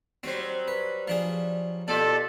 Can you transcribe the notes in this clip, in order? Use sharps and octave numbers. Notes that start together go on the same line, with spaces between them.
F#3 G3 C4 C5
B4
F3 D4 G#4
B2 F4 G4 A4 D5